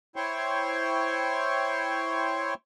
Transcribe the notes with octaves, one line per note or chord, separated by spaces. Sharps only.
E4 C5 C#5 G5 C6 C#6